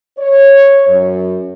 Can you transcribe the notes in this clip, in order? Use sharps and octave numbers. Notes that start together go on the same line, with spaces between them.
C#5
F#2